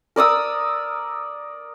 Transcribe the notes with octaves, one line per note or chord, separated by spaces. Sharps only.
A#4 D5 D#6 E6